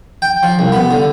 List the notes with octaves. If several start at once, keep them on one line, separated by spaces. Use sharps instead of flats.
G5
F3
C2
B3
D3